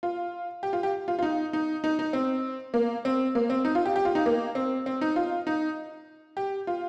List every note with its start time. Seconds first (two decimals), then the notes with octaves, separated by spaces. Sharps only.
0.03 F4
0.63 G4
0.73 F4
0.83 G4
1.08 F4
1.19 F4
1.23 D#4
1.53 D#4
1.84 D#4
1.99 D#4
2.13 C4
2.74 A#3
3.05 C4
3.35 A#3
3.50 C4
3.65 D#4
3.75 F4
3.85 G4
3.96 G4
4.05 F4
4.15 D#4
4.26 A#3
4.55 C4
4.86 C4
5.01 D#4
5.16 F4
5.47 D#4
6.37 G4
6.67 F4